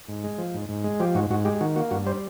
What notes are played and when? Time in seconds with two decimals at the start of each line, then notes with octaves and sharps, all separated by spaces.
0.09 G#2
0.24 G#3
0.38 F3
0.54 G#2
0.69 G#2
0.84 G#3
1.00 F3 G4
1.15 G#2 F#4
1.30 G#2 F#4
1.45 G#3 G4
1.61 D#3 F#4
1.76 A#3 F#4
1.91 G2 F#4
2.06 G3 C5